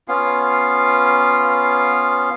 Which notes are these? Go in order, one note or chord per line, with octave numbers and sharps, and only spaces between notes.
B3 C#4 F4 F5